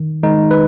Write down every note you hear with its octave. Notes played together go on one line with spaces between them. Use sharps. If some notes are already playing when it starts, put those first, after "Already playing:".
Already playing: D#3
D#3 G#3 D#4
B4